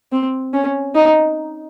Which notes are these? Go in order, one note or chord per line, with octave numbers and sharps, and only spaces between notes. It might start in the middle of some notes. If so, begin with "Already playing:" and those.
C4
C#4
D#4